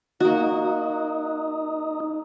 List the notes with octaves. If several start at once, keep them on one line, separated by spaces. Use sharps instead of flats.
A#3 D#4 F#4